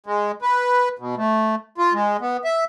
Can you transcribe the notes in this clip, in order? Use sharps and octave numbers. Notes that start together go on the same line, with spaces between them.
G#3
B4
B2
A3
F4
G#3
B3
E5